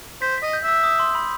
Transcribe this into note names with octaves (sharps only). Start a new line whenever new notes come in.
C5 B6
D#5 B6
G6
E5 E6
D#6
C6
B5